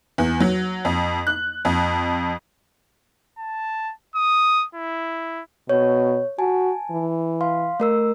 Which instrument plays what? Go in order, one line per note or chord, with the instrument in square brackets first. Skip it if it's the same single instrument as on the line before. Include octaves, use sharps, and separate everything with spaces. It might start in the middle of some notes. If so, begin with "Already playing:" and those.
[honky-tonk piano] E2
F#3
F2
F#6
F2
[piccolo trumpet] A5
D#6
E4
[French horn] B2 [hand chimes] C#5
[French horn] F#4 [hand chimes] G#5 A5
[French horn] E3
[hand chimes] F5 C6
A3 A#4 E6